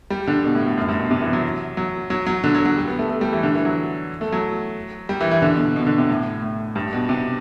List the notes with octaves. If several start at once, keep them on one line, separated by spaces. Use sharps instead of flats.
G3
D3
B2
A2
A2
F#2
G2
B2
C3
E3
F#3
F#3
F#3
F#3
D3
F#3
F#3
G3
B3
A3
A3
G3
E3
D3
E3
F#3
A3
F#3
G3
E3
E3
D3
B2
B2
B2
D3
C3
A2
A2
G2
B2
C3